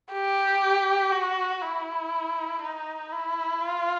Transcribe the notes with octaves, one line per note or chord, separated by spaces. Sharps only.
G4
F#4
E4
D#4
E4
F4